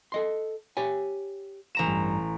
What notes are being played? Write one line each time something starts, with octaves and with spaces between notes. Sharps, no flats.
A4 D#5 C6
G4 C#5 G#5
A1 A#5 E7
G2